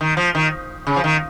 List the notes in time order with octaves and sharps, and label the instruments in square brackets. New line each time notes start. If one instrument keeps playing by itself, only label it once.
[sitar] D#3
F3
D#3
C#3
F3
D#3